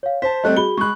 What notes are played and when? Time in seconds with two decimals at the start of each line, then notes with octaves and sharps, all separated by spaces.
0.03 C#5 F5
0.22 C5 A5 B6
0.44 G3 A3 C4 D#5 F#6
0.57 F#4 G#4 B5 G7
0.78 G#3 B5 C#6 F#6